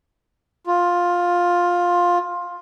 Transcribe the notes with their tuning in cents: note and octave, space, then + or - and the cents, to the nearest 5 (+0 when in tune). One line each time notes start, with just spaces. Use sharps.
F4 +10